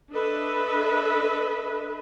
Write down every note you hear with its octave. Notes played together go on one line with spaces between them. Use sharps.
D4 A4 B4 D#5 E5